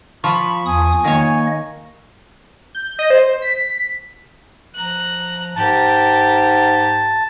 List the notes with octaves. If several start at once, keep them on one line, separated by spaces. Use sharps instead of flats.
F3 B5 C#6
E2 G#5 D#6
D#3 A#3 C#5 D#5
G6
D#5
C5
B6
F3 A#5 F#6
G#2 G4 A#4 A5